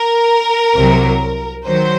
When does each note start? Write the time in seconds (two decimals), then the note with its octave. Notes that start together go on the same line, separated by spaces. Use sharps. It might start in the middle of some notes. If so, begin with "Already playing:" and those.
Already playing: A#4
0.75 C2 C3 F#3
1.66 D#3 F#3 C5